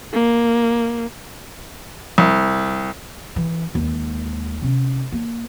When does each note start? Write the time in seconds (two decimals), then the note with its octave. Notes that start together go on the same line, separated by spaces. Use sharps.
0.14 A#3
2.18 C2
3.36 E3
3.75 D#2 G#3
4.62 C3 C#4
5.12 A#3